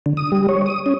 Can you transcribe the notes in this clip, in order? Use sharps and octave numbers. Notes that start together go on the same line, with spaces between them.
D3
D#6
G3
C#5
D#6
C#4